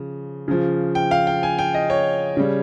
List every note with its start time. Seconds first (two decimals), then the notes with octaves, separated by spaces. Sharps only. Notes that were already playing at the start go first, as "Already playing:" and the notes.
Already playing: C#3 F3
0.48 C#3 F3
0.95 G5
1.11 F5
1.27 G5
1.43 G#5
1.59 G5
1.74 D#5
1.90 C#5
2.37 C#3 G3